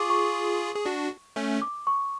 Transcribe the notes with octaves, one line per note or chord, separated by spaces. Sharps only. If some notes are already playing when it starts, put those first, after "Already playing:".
Already playing: F4 G#4 C#6 D6
C#6
G#4
D4 F#4
A3 C#4
D6
C#6